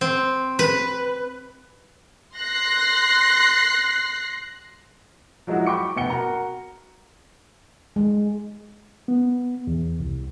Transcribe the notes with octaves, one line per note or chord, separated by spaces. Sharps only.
C4
B4
C6 F#6 A#6 C7
F3 F#3 G#3 D#4 E4 F#4
G5 B5 C#6 D6 C#7
F1 B2 F#5 G5 C#7 G7
F#4 A#4 A#5
G#3
B3
E2
C2